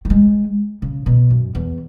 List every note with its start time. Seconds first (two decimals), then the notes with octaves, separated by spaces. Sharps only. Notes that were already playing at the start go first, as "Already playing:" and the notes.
0.05 F#3
0.10 G#3
0.82 C#3
1.06 B2
1.30 F#2
1.55 E2